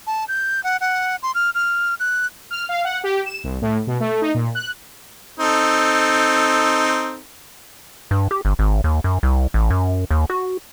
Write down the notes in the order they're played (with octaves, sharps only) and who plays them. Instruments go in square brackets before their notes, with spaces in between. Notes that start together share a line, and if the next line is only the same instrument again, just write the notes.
[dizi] A5
G6
F#5
F#5
C6
F6
F6
F#6
[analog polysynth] F6
F5
F#5
G4
E7
C2
A2
B2
A3
D#4
A#2
F#6
[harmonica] C4 D#4 A4
[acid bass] G2
G4
G1
G#1
D#2
F#2
C2
A1
F#2
D#2
F#4